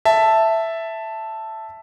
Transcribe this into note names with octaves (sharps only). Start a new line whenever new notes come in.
E5 A5